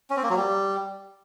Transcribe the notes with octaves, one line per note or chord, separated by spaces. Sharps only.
C#4
C4
A#3
F#3
G3